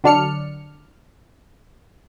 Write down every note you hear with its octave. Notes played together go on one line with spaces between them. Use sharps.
D3 F#3 D4 D5 F6 C#7